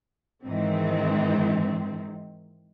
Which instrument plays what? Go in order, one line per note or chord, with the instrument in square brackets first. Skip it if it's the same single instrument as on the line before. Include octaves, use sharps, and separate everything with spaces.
[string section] G#2 D#3 E3 C4